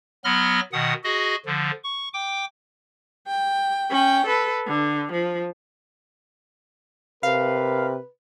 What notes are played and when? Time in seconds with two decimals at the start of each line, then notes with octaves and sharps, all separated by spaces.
0.24 F#3 B3 B5 C6 F6 A#6
0.73 B2 D#3 F#5 D#6
1.04 F#4 G#4 D#5
1.46 D3 F3
1.83 C#6
2.14 G5 D6
3.28 G5
3.91 C#4 G5
4.27 A4 B4
4.67 D3
5.12 F3
7.23 C3 A#4 B4 F5